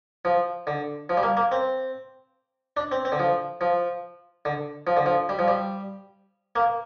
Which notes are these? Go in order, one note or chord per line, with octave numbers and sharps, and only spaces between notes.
F3
D3
F3
G3
A#3
A#3
C4
D4
C4
C4
D3
F3
F3
D3
F3
D3
F3
G3
F3
G3
A#3